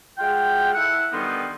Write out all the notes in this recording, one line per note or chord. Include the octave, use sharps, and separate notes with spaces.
G#3 F4 F#5 G5
E4 A4 E5 F#5
D3 D#3 G3 B3 D#4 C6